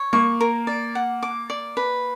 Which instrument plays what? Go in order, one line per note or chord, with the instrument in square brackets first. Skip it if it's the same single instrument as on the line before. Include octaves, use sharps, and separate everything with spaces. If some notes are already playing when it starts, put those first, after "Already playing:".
Already playing: [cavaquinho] C#5
[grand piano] A#3 [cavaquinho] C#6
[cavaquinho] A#4
D5
F#5
D6
D5
B4